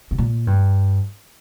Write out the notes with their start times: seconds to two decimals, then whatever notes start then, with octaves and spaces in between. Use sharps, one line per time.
0.11 C3
0.18 A#2
0.47 G2